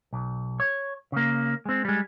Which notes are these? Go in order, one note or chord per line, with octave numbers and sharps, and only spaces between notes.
B1
C#5
C#3 A#3
G#3 C4
G3 G#3